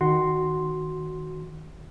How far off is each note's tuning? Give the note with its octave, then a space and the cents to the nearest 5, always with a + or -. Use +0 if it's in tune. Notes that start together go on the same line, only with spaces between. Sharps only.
D#3 +0 F#4 +0 C6 +0